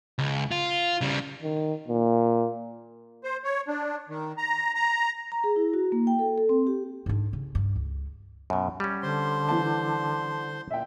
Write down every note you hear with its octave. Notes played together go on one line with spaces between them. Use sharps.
C#2
F4
C#3 G3
D#3
A#2
C5
C#5
D4
D#3
A#5
A#5
A#5
G#4
E4
F#4
A#3
G5
A4
A4
C4
G4
G#2 D4
C#3
G2
C#2
F#2 B2
G3 C#4
D3 C5 C6
E3 A5
A#2 E5 G5